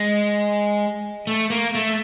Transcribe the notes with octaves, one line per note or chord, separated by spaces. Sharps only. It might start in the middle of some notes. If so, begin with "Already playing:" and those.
Already playing: G#3
A3
A#3
A3